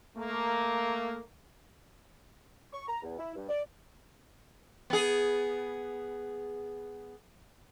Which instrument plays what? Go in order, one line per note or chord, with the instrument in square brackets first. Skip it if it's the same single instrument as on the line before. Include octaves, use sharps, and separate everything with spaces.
[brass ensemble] A3 A#3
[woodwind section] C#6
A#5
E2
E4
G2
D5
[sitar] B3 G#4